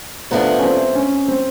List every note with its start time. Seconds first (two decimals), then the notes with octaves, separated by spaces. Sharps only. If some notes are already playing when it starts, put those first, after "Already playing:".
0.31 C3 F3 A3 B3 D4
0.59 C#4
0.63 C4
0.95 C#4
1.28 C4